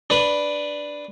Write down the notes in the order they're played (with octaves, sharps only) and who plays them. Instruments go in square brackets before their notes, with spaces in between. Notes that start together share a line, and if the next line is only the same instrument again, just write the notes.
[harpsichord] D4 B4